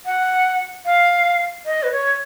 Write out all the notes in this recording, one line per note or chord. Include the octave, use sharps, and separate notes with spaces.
F#5
F5
D#5
B4
C#5